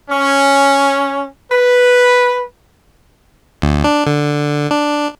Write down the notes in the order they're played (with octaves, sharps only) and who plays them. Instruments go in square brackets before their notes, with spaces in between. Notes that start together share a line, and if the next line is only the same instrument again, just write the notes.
[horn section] C#4
B4
[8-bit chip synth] D2
D4
D3
D4